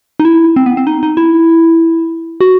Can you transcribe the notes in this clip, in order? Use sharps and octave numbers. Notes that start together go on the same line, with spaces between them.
D#4
E4
C4
B3
C4
D#4
D#4
E4
F#4